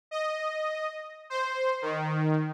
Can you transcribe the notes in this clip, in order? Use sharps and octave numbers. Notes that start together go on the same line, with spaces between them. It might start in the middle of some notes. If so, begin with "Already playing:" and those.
D#5
C5
D#3